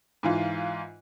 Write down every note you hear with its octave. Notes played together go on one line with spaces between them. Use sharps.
G#2 E3 F4